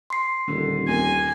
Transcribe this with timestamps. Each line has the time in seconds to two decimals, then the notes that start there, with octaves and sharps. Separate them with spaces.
0.10 C6 C7
0.48 D#1 D3
0.88 D#2 G#5